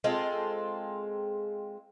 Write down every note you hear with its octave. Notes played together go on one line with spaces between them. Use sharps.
G#3 C4 F4 A4